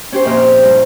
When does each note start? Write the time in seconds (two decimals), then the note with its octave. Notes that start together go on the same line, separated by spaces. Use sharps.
0.12 C#4 G4 C5
0.25 F2 A#2 E5 F6
0.39 F6
0.63 G2